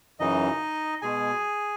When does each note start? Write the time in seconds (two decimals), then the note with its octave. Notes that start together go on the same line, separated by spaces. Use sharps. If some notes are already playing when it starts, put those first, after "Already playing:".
0.20 F#2 C#3 E3 D#4 D#5
1.02 B2 G#3 G#4 G#5